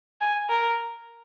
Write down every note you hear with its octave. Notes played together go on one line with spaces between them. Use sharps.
G#5
A#4